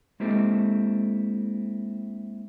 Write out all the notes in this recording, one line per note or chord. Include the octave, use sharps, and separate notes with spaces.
G#3 A#3 C4 E4 G4 A4